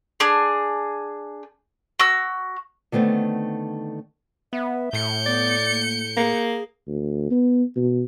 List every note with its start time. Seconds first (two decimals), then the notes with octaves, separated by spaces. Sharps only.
0.20 D4 G#4
1.99 F#4 E6
2.92 D3 D#3 A3 B3 C4
4.53 B3 E5
4.93 A2 G6 C#7
5.26 B3 D5
5.69 A#3
6.17 A#3 G#4
6.87 D2
7.31 B3
7.76 B2